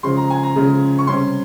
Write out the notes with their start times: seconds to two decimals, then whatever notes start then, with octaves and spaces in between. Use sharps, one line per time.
0.03 C#3 F3 G#3 C6
0.17 A#5
0.30 G#5
0.43 A#5
0.55 C#3 F3 G#3
0.98 C#6
1.07 C3 G3 C#4 C6